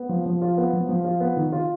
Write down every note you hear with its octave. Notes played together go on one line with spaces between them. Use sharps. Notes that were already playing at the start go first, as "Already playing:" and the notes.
Already playing: B3
F3
F3
F4
B3
F3
F3
F4
B3
D#3
F4